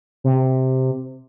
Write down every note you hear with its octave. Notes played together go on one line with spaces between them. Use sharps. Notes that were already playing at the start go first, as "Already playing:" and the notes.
C3